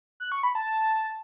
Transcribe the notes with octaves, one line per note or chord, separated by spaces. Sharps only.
F#6
C#6
B5
A5